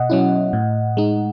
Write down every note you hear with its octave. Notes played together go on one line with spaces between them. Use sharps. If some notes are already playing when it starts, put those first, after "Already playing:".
Already playing: B2 D#5 F#5
F#3 C#4 E4
A2
G#3 D#4